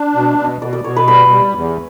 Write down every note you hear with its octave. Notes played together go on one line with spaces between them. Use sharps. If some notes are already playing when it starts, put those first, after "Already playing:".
Already playing: D4
B2
B2
B2 D5
D5
B2 C#5
B4
G3 B4
G3
E2